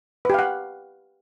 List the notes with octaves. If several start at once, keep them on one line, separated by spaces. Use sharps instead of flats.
G4 B4 F5 F#5